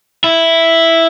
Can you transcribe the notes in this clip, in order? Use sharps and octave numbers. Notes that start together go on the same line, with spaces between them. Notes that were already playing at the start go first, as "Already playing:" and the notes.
E4